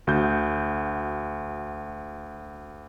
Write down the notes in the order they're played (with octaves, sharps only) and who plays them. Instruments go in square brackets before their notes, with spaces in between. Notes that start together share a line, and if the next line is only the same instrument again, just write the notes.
[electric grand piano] D2 F#4 G6